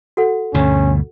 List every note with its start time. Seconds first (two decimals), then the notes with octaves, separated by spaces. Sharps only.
0.17 F#4 A4 F#5
0.54 D2 G2 B2 C#4